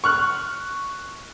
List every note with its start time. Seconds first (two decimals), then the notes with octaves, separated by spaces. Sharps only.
0.04 C#6 F6 F#6